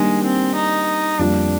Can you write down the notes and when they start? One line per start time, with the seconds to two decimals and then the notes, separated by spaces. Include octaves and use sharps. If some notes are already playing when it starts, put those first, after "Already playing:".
Already playing: D#3 G3 G#3 A#3 D4
0.24 C4
0.55 D#4
1.19 F2 D3 G3 A#3 D4 F4